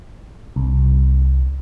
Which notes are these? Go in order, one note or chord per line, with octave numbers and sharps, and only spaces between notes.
C2